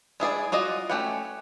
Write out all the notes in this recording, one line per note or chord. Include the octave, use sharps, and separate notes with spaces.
G#3 E4 G#4 D5
F4 F#4 D5 D#5
A3 C#4 G4 C#5 F#5